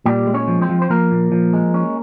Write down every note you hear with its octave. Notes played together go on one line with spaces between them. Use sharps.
A#2 G3 G4
G#3
C#4 C#5
F3
C4 C5
F3
C5
F3 A#3 A#4
A#2
F3
G#3
C#4